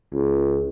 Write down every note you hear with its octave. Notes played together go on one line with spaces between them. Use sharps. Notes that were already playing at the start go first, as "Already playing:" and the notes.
C#2